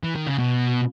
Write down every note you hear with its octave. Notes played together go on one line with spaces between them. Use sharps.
E3
D#3
C#3
B2